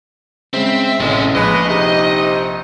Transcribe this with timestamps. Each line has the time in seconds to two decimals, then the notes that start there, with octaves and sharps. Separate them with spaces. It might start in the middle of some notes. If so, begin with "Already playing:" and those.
0.53 C#3 G#3 C4 E5
1.00 A1 A2 C3 G#3 C#4
1.35 A#1 C#3 G#3 B4 D#5
1.68 C3 D#4